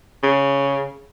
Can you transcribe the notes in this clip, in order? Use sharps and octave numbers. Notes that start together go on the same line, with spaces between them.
C#3